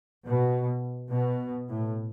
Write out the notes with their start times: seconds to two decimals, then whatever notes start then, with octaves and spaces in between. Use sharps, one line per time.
0.25 B2
1.11 B2
1.69 A2